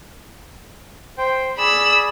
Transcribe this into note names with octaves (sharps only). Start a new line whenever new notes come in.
C5 G5
G#4 D5 B5 E6